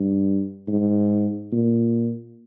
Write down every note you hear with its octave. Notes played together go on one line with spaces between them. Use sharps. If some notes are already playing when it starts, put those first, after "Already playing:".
Already playing: G2
G#2
A#2